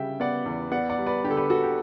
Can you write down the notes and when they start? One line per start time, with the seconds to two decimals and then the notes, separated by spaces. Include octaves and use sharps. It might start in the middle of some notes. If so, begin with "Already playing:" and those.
Already playing: C#3 G3 E5 G5
0.20 B3 D5 F#5
0.46 E2
0.72 B3 D5 F#5
0.90 D5 F#5
0.99 G3
1.06 B4 D5
1.24 D3 G4
1.30 A4
1.37 G4 B4
1.50 D3 F#4 A4
1.64 G4